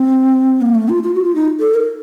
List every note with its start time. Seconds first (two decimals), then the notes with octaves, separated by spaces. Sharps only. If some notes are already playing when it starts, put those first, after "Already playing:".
Already playing: C4
0.61 A#3
0.75 A3
0.89 F4
1.03 F4
1.14 F#4
1.24 F4
1.35 D#4
1.60 A4
1.74 A#4